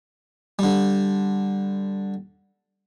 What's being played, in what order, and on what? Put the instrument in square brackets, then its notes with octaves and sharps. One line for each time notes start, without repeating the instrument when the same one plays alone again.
[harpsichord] D3 G3